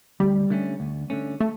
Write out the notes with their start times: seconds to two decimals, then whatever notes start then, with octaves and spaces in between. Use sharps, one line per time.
0.20 D2 G3
0.50 D3 A3 C#4
0.80 D2
1.10 D3 A3 C#4
1.40 A3